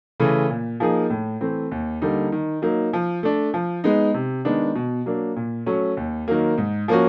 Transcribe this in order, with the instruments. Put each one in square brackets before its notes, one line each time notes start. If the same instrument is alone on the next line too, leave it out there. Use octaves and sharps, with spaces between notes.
[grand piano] C#3 E3 A3
A#2
F3 A#3 D#4 G#4
A2
E3 A3 C4
D#2
D3 G3 A#3 D#4
D#3
F#3 A#3 D#4
F3
A3 D4
F3
G#3 B3 D#4
C3
D#3 G#3 B3 D4
B2
F#3 A#3 D4
A#2
F#3 A3 C#4
D#2
D#3 F#3 A#3
G#2
F3 A#3 C#4 F#4